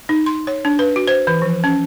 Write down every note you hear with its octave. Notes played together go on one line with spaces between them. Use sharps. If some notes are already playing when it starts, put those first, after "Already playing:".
D#4
C6
C#5
D4
B4
F#4
C5
E3
F3
C#4